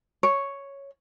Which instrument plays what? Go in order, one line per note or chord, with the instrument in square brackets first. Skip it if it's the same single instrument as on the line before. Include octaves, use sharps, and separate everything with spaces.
[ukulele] C#5